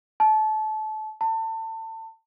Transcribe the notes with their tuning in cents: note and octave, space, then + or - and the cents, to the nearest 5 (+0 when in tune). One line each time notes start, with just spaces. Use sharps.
A5 -25
A5 +30